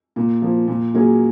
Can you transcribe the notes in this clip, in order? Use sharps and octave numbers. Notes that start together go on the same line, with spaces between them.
A#2
F3 A#3
A#2
F#3 A#3 C#4 G#4